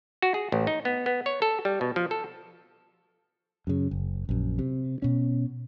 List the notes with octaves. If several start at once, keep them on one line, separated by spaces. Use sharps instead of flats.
F#4
G#4
A1
D#4
B3
B3
C#5
A4
G3
B2
F3
A4
F#2 C#3
F#1
A#1 F#2
C3
B2 C#4